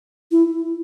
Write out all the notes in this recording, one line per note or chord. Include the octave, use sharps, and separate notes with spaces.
E4